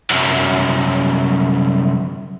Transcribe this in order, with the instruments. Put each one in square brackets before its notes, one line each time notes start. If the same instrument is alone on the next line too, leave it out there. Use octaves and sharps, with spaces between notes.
[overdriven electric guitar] C2 F#2